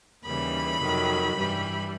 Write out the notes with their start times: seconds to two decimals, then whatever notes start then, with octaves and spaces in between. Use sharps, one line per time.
0.24 D#2 C#3 E3 G3 B5
0.80 F2 C3 D#3 F#3
1.36 G2 E3 G3